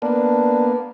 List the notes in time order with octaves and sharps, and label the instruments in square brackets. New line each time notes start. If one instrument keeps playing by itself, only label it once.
[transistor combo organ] A#3 B3 [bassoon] D4